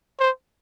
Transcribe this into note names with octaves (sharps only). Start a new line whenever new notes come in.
C5